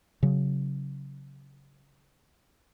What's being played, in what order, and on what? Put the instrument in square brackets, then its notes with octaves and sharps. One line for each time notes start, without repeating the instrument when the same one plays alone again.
[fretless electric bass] C#3 F#3